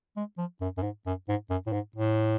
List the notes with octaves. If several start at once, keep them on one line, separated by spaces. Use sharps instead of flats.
G#3
F3
F#2
F#2
G#2
F#2
G#2
F#2
A2
G#2
A2